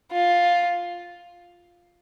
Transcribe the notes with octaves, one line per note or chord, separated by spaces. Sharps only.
F4